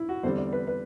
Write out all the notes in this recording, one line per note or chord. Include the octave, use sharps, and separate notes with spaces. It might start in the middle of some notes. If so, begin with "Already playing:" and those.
Already playing: E4
F#4
E2 D3 G3 C4 C5
D5
B4
B4